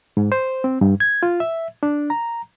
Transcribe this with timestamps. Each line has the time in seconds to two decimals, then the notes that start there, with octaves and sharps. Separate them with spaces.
0.17 G#2
0.32 C5
0.64 C4
0.81 G2
1.00 G#6
1.23 F4
1.40 E5
1.83 D4
2.10 A#5